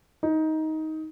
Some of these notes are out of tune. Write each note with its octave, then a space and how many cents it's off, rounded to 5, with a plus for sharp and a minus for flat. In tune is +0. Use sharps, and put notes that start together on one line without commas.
D#4 +15